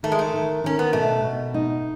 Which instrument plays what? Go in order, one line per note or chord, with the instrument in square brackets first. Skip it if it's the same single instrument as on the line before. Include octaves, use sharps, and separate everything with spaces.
[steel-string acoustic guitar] D#3 [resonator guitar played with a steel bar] A3
[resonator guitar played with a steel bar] G#3
A3
[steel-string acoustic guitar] D#3
[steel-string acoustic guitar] D#3 [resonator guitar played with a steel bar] C#4
[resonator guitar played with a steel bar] B3
[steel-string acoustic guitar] B2 [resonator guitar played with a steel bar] A3
[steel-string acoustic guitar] B2
D#4